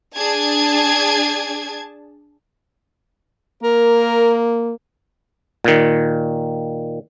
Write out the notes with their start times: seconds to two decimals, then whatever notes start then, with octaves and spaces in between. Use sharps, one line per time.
0.16 D4 G#4 A5 G#6
3.63 A#3 A#4
5.64 A#2 D#3